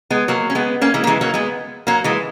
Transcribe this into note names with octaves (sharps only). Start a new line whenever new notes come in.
G#3 B3
F#3 A#3
C#4
G#3 B3
A#3 C#4
E3 G#3
A#3
E3 G#3
F#3 A#3
G#3 B3
F#3 A#3
E3 G#3